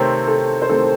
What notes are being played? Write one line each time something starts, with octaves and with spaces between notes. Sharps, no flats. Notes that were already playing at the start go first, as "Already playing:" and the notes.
Already playing: C3 D#3 A3 C4 C#5
A4
C5
C3 D#3 A3 C4 A4